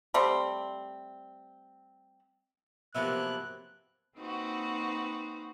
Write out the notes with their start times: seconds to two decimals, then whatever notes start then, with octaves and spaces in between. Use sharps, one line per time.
0.14 G3 A3 C4
2.95 C3 F3 F#3 A#3 B3 E5 F#6
4.17 A#3 C4 D#4 F#4 B4